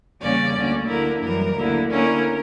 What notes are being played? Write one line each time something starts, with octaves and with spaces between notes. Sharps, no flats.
E2 C#3 G3 A#3 C#4 D5
D2 D3 A#3 C#4
D2 D3 A#3 E4 A#4
F#2 E3 G3 A#4
D2 D3 A#3 E4
D3 A#3 C#4 E4 A#4